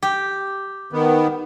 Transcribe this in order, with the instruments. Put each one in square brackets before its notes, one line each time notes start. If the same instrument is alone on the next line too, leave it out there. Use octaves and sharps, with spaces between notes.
[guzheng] G4
[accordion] D#3 B3